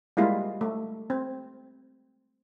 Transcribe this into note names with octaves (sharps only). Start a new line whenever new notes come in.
G3 G#3 A#3 E4 F4
A3
C4